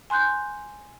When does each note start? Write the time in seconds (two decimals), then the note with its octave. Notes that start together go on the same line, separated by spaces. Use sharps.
0.10 G#5 C6 F#6 G6